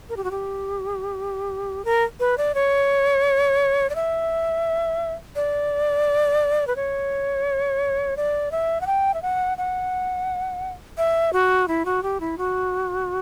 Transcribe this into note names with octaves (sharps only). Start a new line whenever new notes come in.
A#4
G4
F#4
G4
A#4
B4
D5
C#5
D5
E5
D5
B4
C#5
D5
E5
F#5
G5
E5
F#5
F#5
E5
F#4
E4
F#4
G4
E4
F#4